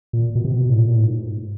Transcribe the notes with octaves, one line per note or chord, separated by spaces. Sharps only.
A#2
B2
C3
B2
A2
A#2
A2
G#2